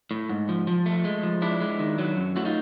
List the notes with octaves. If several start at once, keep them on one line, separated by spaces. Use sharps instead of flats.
A2
G#2
F3
F3
A3
G#3
F3
G#3 D4 E4
G#3
D#3
F#3
F#2
A3 E4 F#4
D#4 F4